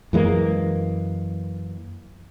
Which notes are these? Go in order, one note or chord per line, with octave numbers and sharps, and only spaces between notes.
F#2 E3 G#3 A#3